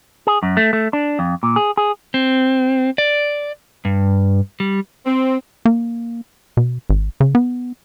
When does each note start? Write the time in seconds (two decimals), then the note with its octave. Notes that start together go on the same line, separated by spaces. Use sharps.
0.27 G#4
0.43 F#2
0.57 A3
0.73 A3
0.93 D4
1.19 F2
1.43 A#2
1.56 G#4
1.77 G#4
2.14 C4
2.98 D5
3.85 G2
4.60 G3
5.06 C4
5.65 A#3
6.57 B2
6.89 G#1
7.20 C#3
7.35 B3